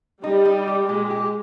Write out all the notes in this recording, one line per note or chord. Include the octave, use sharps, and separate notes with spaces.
G3 D#4
D#4
G4
A#2 G#3
G4